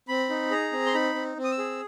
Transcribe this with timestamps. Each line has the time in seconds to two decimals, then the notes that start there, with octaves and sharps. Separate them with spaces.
0.09 C4 B5
0.30 D#4
0.51 G#4 A#5
0.72 C4
0.86 C6
0.94 D#4 B5
1.15 C4
1.37 C4
1.44 D#6
1.51 E6
1.58 G#4